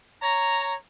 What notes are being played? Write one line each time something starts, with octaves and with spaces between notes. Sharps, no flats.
C#5 A#5